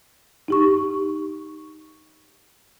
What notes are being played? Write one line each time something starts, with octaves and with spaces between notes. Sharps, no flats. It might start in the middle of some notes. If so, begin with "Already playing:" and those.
D#4 G4 C#6